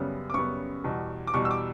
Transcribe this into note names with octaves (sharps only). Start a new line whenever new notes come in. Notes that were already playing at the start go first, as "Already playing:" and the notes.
Already playing: F#2 C#3 G3 B3
D6
F#2 C#3 G3 B3 C#6
E2 B2 G3
D6
E2 B2 G3 C#6
E6
D6